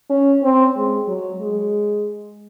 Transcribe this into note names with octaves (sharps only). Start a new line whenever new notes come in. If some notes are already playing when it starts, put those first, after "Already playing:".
C#4
C4
G#3
F#3
G#3